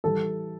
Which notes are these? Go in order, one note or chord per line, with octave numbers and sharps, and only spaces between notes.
E3 G3 A4